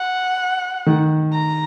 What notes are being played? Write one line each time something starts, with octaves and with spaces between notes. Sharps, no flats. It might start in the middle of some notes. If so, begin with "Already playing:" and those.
Already playing: F#5
D#3
A#5